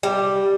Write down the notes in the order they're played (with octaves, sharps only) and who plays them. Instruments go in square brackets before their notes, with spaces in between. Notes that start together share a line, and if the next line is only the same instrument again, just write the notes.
[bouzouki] G3